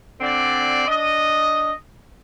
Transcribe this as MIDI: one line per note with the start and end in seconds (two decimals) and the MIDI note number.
0.21 0.87 50
0.21 0.87 60
0.21 0.87 74
0.88 1.72 62
0.88 1.72 75